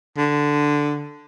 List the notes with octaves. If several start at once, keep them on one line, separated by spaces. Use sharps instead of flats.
D3